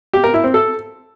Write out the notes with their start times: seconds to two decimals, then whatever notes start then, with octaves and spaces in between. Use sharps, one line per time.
0.13 G4
0.24 A#4
0.34 E4
0.44 C4
0.54 A4